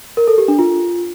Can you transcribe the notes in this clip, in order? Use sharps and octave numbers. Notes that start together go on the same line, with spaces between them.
A#4
A4
G4
D4
F4